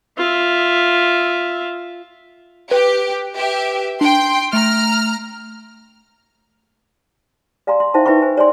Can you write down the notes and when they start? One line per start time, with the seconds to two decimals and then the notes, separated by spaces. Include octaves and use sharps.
0.18 F4 E5
2.71 G4 B4
3.36 G4 E5
4.01 D4 G5 C6
4.53 A3 A#5 F6
7.67 D5 F5 G#5 A#5 C6
7.80 C6
7.94 D#4 C5 E5 F5 G5 A5
8.06 D#4 B4 E5 G5 B5 C#6
8.22 C5 G#5
8.37 C#5 D5 G#5 C6